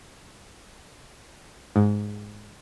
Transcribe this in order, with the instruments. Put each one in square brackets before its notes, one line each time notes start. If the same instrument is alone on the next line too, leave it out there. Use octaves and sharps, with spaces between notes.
[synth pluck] G#2